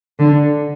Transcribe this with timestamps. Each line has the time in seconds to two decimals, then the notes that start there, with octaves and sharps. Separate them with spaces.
0.20 D3